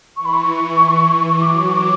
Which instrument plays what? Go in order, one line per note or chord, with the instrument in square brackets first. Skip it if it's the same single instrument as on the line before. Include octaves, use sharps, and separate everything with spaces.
[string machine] E3 [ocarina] C#6
[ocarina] B5
C#6
[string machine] E3
[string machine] F#3 [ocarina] D6
[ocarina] C#6
D6